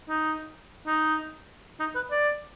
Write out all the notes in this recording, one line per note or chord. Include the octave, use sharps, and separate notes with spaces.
D#4
D#4
D#4
B4
D5